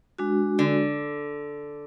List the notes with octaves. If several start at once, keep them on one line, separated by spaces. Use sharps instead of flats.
G#3 D4 F#4
D3